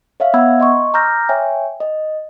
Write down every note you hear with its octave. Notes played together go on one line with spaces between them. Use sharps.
C#5 E5 F5
B3 E5 F#5 B5 E6 G#6
D#5 C6 C#6
A#5 D6 E6 F6 G6 A#6
C#5 E5 G5 G#5
D#5